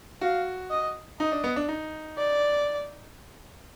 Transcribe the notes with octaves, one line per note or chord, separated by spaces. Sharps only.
F#4 F5
D#5
D#4 D#5
D4
B3
D4
D#4
D5